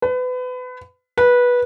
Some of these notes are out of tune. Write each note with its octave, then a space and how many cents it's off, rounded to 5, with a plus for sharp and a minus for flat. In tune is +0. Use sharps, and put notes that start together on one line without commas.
B4 +30
B4 -15